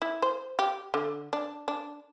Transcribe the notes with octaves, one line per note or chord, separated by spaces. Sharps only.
E4
C5
G4
D3
D4
D4